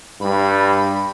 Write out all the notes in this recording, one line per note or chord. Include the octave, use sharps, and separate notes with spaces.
G2 B5